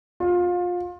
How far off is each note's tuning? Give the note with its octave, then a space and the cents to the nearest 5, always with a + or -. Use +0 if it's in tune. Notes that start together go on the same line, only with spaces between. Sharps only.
F4 +25